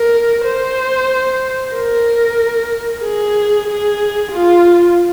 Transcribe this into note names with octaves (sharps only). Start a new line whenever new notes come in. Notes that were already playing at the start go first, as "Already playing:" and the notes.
Already playing: A#4
C5
A#4
G#4
G#4
F4